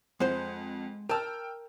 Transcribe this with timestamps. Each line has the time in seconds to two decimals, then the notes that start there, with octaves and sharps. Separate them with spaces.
0.20 F2 G#3 C5 F#5
1.09 A#4 G5 A5 E6 F6